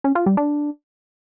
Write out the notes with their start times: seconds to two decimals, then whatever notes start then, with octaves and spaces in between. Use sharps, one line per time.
0.04 C#4
0.15 F4
0.26 G3
0.37 D4